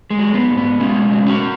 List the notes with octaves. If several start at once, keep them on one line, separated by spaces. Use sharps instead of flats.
G#3
F#3
B3
G#2
B3
B2 G#3 C#4
F#3
C#4 F#4